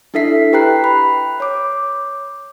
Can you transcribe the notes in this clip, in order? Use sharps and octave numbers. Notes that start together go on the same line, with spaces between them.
D4 E4 A4 E5 B6 C7
G4 B4 G5 A#5 F#6 C7
B5
C#5 D6